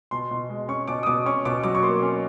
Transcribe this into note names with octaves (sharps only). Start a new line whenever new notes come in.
B2 C6
B2
G#3
C#4 C#6
B2 D6
D#6
B2 D6
C#4 C#6
B2 D6
F#3 D6
C#6
A#3 C6
C#4